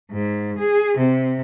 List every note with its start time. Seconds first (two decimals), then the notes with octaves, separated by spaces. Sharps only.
0.11 G#2
0.58 G#4
0.97 C3